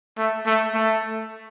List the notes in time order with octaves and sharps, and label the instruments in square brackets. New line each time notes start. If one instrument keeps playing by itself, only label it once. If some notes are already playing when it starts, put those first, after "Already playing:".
[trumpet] A3
A3
A3